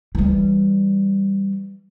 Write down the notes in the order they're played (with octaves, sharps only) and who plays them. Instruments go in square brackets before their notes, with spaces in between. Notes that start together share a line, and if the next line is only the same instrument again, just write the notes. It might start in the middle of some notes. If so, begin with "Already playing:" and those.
[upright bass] E3 G3